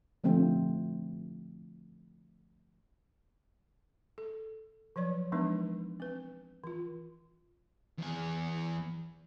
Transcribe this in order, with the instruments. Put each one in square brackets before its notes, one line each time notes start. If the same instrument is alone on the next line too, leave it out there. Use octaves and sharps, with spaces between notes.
[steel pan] D3 F3 A3 C4
[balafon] A4
F3 F#3 C#5 D5
E3 F3 G#3 B3 D4 D#4
C4 B4
E3 F4
[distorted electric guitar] E2 G#4